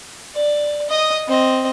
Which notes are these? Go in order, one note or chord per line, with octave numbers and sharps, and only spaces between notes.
D5
D#5 D#6
C4 D#5